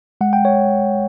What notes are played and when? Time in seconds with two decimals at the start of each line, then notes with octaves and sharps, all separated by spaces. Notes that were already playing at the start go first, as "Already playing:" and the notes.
0.21 G#3 F#5
0.33 G5
0.45 C#5